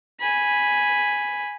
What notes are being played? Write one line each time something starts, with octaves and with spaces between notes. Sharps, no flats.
G#5 B5